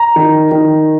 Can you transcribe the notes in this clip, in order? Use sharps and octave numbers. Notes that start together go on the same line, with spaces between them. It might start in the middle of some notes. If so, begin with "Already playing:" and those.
Already playing: A#5
D#3
D#3